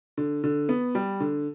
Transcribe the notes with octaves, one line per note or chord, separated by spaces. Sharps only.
D3
D3
B3
G3
D3